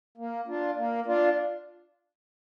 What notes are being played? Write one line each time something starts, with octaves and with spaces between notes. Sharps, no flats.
A#3
D4 F4
A#3
D4 F4